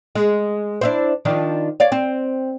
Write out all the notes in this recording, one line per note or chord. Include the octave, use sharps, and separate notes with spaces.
G#3
D4 E4 C5
D#3 F3 D4
C#5 D5 F5
C4